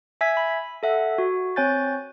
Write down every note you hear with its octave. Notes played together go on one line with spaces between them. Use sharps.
E5 G#5 E6 G#6 B6
B5
A4 E5 F#5
F#4
C4 C#5 G#5 G6 A6